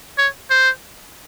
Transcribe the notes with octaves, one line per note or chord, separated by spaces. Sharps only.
C#5
C5